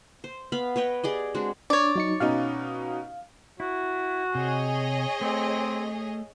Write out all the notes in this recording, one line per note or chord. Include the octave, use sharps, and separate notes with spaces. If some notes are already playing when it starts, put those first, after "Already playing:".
C5
B3 F5 B5
B4 C#5 D#5 G5
G4 G#4 D5 D#5
G#3 C4 D4 F#4
D4 C#5 D5
F#3 D#4 C#7
B2 C#4 D#4 F5
E4 F#4
C3 G#4 C#5 D#5
A3 C4